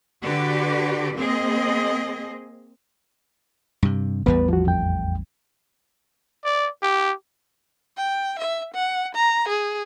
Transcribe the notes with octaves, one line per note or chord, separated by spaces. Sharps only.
D3 F#4 G4 B4 D5
A#3 C4 G#4 D#5
G2 C3
A1 E2 G3 B3 B4
F3 F#4
F2 G5
D5
G4
G5
E5
F#5
A#5
G#4